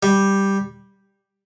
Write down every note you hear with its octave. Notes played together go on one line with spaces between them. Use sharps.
G3